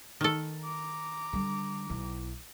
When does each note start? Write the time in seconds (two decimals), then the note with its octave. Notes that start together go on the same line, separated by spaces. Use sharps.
0.21 D#3 A4
0.62 A#5 D6
1.33 D3 G3
1.90 B1 E4